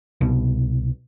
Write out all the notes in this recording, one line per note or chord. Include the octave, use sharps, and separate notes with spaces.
C2 B2